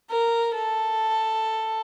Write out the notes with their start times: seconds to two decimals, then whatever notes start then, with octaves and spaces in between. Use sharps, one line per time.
0.10 A#4
0.56 A4